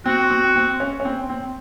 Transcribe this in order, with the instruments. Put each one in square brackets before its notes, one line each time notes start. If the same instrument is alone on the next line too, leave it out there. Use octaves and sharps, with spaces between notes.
[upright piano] C4 [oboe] F#4
[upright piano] C4
C4
C#4
C#4
C4
C4